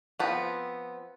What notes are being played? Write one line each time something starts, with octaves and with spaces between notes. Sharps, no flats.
F3 B3 C4